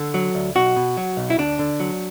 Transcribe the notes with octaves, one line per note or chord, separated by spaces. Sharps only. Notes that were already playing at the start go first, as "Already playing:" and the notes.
Already playing: D3 A4
F#3
D2
B1 F#4
B2
F#3
B1
E4
D2 D4
D3
F#3